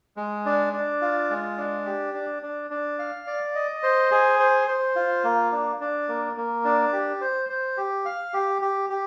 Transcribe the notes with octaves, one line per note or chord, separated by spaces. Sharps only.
G#3
D4
D4
F4
G#3
D4
G4
D4
D4
D4
F5
D5
D#5
C5
G#4
C5
C5
F4
A#3
D4
D4
A#3
A#3
D4
G4
C5
C5
G4
F5
G4
G4
G4